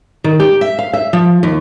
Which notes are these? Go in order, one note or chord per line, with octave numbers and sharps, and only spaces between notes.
D#3
G4
E5
F5
E5
F3
D#2